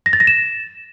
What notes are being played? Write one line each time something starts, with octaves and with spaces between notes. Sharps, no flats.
A#6
A6
A#6
E7